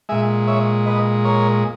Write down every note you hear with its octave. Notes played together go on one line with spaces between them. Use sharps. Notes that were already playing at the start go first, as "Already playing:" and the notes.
A#2 G#3 E5 G#5
C#5 E5
B4 D#5
A#4 C#5